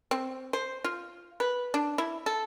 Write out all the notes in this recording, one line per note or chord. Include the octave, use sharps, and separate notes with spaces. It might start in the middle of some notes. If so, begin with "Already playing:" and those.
C4
C5
F4
B4
D4
E4
A4